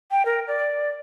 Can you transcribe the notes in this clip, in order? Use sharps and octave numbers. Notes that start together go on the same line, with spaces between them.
G5
A#4
D5